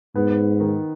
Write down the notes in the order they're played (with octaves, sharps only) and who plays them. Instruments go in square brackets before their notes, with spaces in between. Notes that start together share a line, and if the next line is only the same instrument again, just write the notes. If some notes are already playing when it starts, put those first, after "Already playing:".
[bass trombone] G#2 [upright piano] B3
[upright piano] D#3